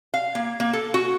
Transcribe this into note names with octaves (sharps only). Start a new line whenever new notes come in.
F5
A#3
A#3
A4
F#4